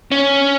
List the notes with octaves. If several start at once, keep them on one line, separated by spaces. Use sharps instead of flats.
C#4